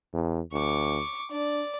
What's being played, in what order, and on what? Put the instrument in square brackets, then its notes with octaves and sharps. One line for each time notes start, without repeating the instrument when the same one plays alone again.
[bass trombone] E2
[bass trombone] D2 [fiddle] C#6 D6
[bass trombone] D4 [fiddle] D5